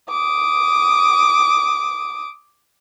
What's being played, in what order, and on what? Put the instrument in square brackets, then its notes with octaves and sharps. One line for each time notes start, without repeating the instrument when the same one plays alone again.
[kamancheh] D6 D#6